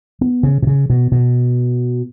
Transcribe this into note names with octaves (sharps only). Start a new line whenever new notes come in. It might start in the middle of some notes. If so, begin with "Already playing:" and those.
B3
C#3
B2
C#3
B2
B2